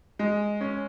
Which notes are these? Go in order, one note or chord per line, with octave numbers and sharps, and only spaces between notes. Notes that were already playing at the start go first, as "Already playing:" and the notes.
G#3
C#4